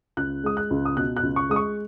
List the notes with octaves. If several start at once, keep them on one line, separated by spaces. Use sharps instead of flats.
C#2 F#6
G#3 D#6
F#6
C#2
D#6
B2 F#6
F#6
C#2
C#6
G#3 D#6
C#6